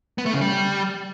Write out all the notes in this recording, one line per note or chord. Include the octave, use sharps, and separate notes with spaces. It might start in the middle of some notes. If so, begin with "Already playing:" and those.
B3
A3
C#3
G3